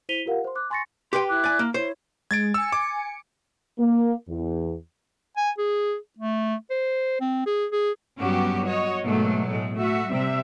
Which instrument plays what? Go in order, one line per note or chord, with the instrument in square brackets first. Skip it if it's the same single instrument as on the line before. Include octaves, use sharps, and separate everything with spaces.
[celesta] E4 C5 B6 D#7 F7 G7
F4 G4 A#4 F5 F#5
C5 C6
D6 F#6
G#5 C6 C#6 A6 A#6 C#7
[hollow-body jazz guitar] G4 B4 G5 [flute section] C6
[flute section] E4 D6 F#6
[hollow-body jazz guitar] D5 G#5
A#3
[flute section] E4 C#5 [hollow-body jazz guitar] C5
[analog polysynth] G#3 [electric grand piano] G#6 A6 D7
[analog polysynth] G#5 C#7 [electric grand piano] E6
[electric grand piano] D6
[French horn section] A#3
E2
[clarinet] G#5
G#4
A3
C5
C4
G#4
G#4
[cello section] G2 F#3 B3 C#4 F#4 G4
F#4 C#5 D#5
G#2 B2 F#3 A3 A#3
A2 G#3 A3
A3 F#4 E5
C3 G3 C4 E5